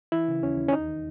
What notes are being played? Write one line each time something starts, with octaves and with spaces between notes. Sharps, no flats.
E3 E4
C#3
D#2 C#4
D#2
C#4
E2 D#4
D#3